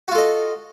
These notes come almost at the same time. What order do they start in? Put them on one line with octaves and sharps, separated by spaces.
F#4 F4 A4 D#5